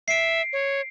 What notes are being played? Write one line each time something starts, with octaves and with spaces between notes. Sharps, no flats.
E5 C7 D7
C#5